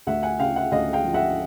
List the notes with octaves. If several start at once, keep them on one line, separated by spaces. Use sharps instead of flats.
D2 E5 F#5
F#5 G#5
C#3 F5 G5
E5 F#5
D2 D#5 F5
F5 G5
F3
E5 F#5